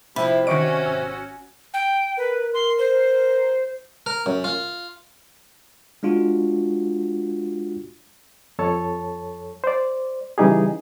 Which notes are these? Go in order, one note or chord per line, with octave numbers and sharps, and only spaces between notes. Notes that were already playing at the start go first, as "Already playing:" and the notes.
C3 F3 E4 E5 B5
D#3 C#4 F#4 D5 D#5 C#6 D7
G#1 E6
G5
A#4 B4
C6
C5
A#4
F#2
F4
G#3 D4 F4 F#4
F2 A4 C#5 A5
C5 D5
C#3 E3 G3 D#4 G4 G#4